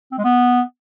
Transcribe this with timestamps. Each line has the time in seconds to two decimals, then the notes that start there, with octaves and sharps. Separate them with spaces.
0.12 C4
0.18 G#3
0.24 B3